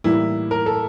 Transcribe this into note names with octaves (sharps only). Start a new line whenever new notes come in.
A2 E3 G3 A#3 E4
A#4
A4